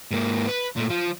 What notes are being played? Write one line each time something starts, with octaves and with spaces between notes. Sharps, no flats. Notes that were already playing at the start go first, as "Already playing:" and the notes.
G#2 A#3
B4
A#2 A3
F3